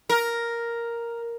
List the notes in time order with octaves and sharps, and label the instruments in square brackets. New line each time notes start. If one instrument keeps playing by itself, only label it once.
[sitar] A#4